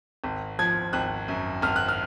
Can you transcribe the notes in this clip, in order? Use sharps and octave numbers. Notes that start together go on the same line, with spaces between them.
G#1
F3 G#6
G#1 F#6
F#2
G#1 F6
F#6
F6